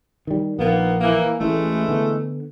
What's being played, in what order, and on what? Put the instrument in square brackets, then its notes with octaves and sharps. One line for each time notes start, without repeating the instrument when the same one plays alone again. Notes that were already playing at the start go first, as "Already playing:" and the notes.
[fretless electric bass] D#3 G3
[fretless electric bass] A#1 [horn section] D#3 A#3 B3
[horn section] E3 A#3
[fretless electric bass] A1 A2 [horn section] E3 G#3 A3
[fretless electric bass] D3 B3